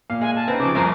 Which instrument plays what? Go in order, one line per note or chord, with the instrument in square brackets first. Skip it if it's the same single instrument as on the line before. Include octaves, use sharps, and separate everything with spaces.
[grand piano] A#2 [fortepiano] F5
[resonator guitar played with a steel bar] G#3 [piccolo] G#5
[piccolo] A5
[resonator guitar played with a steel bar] C4 C#4 D#4 [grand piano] B4
[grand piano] C#3 F3 [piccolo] D6
[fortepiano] C2 F2 [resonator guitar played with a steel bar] C4 A#4 C5